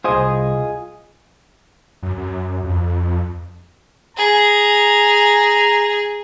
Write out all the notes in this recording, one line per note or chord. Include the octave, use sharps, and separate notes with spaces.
C2 F4 G#4 C5 D#5
F#2
F#2
F2
G#4 A#5